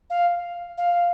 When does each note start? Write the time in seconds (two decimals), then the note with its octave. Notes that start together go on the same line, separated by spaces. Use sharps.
0.10 F5
0.78 F5